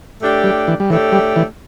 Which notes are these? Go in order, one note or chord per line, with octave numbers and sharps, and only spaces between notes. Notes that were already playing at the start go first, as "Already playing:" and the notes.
A2 A3 D4 G4
G3
E3
G3
A2 E3 A3 D4 G4
G3
E3